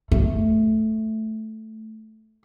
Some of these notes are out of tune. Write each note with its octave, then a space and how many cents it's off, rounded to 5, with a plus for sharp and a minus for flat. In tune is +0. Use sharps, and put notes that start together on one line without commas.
A3 -5